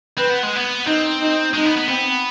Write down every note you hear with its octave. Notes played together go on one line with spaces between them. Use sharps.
C4 B4
B3
G#3
B3
C4 D#4
D#4
G#3 D#4
B3
B3
B3 C4